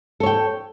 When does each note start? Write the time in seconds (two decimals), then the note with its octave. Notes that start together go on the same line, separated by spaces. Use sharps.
0.20 A4
0.23 C#5
0.26 G5